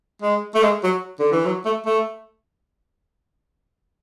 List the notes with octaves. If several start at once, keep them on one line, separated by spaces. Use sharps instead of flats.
G#3
A3
G#3
F#3
D3
E3
F#3
A3
A3